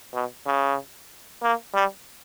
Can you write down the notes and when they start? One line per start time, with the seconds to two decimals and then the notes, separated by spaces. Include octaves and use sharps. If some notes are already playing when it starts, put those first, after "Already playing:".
0.14 B2
0.46 C#3
1.43 A#3
1.74 G3